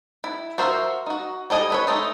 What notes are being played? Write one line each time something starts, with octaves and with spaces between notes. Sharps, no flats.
E4
F#4 A#4 C5 E5 F5
D#4 F#4
G3 A4 D#5 G#5
A4 B4 C#5
G#3 A3 D#4